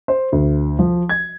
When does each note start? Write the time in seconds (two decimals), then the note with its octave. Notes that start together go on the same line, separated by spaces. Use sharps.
0.08 C5
0.32 D2
0.79 F3
1.09 G#6